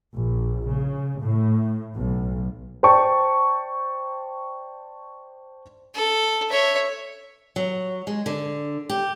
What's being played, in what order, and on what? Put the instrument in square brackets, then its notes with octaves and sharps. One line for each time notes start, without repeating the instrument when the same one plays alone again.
[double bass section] A#1
C#3
A2
B1
[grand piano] C5 D5 G5 A5 C#6
[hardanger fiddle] A4
C#5 E5
[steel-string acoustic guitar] F#3
G#3
D3
G4